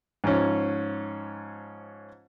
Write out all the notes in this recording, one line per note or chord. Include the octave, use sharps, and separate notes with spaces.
G#2 F3 C#4